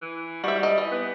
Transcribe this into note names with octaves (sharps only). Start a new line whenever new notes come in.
E3
G3 F#4 E5
D#5
E3
B3